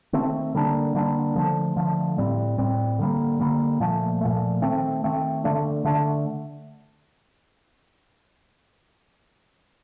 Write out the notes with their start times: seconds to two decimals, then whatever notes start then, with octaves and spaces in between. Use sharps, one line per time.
0.13 D#3 A3 C4
0.55 D3 G3 A#3 D4
0.95 D3 G3 A#3 D4
1.36 D3 F3 A3
1.76 D3 F3 A3
2.18 A2 G3 C4
2.58 A2 G3 C4
2.99 D3 G3 A#3
3.40 D3 G3 A#3
3.80 A#2 F3 A3
4.21 A#2 F3 A3
4.62 D#3 A3 C4
5.04 D#3 A3 C4
5.44 D3 A3 D4
5.85 D3 A3 D4